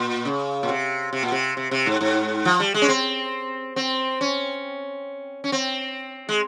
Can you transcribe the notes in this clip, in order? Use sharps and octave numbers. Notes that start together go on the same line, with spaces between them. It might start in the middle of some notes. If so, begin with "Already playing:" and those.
Already playing: A#2
C#3
A#2
C3
C3
A#2
C3
C3
C3
G#2
G#2
F3
G3
G#3
C#4
C4
C4
C#4
C#4
C4
G#3